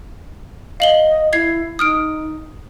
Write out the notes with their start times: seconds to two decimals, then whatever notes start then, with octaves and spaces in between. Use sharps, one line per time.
0.80 D#5 F5 F#7 G7
1.33 E4 G#6 C7
1.79 D#4 D#6 F6 D7